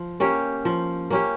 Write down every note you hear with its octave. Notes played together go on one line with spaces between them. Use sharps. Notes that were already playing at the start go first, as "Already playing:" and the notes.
Already playing: F3
A#3 C#4 G4
F3
A#3 C#4 G4